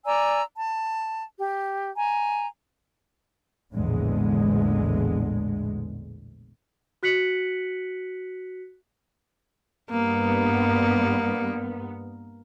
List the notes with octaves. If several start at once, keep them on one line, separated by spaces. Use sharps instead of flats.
D5 G#5 A#5 E6
A5
G4
G#5 A#5
A#1 E2 A2 D3 G#3
F#4 F#6 B6 C#7 F#7
G2 A#3 B3